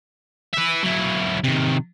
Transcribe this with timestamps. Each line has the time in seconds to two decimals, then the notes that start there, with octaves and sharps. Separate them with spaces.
0.54 B4 E5
0.83 F#3 E4
1.44 C3 D#3